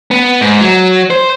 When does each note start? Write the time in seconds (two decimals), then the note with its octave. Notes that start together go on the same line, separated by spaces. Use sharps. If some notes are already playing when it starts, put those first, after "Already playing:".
0.11 B3
0.41 G#2
0.61 F#3
1.11 C5